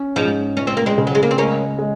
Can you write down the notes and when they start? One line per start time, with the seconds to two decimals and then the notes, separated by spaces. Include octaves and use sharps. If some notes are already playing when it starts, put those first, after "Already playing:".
Already playing: C#4
0.16 G#2 F3 G#3
0.57 C#2 C#4
0.67 C4
0.77 A#3
0.86 G#3 C4
0.98 C#3
1.07 F#3
1.15 G#3
1.23 A#3
1.31 C4
1.38 G#3 A#3 C#4
1.79 G#3